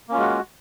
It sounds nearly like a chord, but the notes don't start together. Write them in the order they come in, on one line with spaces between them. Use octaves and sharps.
A#3 C#4 F4 G#3 F#4